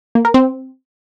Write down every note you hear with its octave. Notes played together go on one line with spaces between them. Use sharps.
A#3
A#4
C4